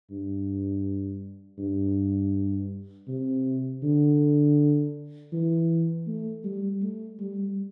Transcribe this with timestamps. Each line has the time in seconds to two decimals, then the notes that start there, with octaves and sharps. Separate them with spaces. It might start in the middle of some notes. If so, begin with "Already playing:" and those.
0.10 G2
1.59 G2
3.08 C3
3.83 D3
5.33 E3
6.07 A3
6.44 G3
6.82 A3
7.20 G3